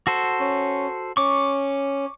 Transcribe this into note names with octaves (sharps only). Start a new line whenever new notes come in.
F#4 A4 C5
C#4
C#4 C#6 D6